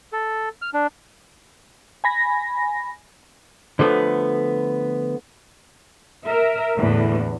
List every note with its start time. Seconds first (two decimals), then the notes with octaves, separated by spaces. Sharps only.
0.13 A4
0.62 F6
0.74 D4
2.04 G#5 B5 A#6
3.79 D3 F3 A3 B3
6.27 A#4 E5
6.77 E2 A2 D3 E3